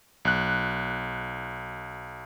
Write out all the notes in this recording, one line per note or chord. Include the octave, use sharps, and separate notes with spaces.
B1 F#6